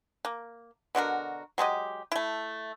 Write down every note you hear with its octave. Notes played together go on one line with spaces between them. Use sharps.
A#3
B2 D3 F#4 A#4
F#3 G#3 G4 D#5
A3 E4